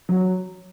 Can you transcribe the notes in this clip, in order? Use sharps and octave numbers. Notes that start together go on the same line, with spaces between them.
F#3